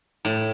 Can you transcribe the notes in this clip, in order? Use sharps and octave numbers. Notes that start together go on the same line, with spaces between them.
A2